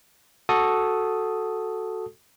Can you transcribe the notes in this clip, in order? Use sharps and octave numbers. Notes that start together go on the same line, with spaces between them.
F#4 A4 D#6